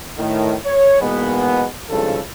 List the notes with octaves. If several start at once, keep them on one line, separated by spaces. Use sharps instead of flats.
A2 D#3
C#5
E2 G#2 B2 G#3 A#3 B3
G#1 G2 C#3 F3 G#3 A4